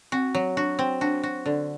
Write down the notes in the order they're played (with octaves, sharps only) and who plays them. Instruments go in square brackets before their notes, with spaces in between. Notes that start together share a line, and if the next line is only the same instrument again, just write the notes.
[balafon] C4 [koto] F#4
[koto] F#3
[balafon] D4 [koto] F#4
[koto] C4
[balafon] D4 [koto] F#4
[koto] F#4
D3